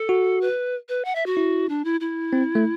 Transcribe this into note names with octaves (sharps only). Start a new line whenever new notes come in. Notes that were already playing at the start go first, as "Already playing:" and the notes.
Already playing: A4
F#4
B4
B4
F#5
E5
F#4
E4
D4
E4
E4
C4
A3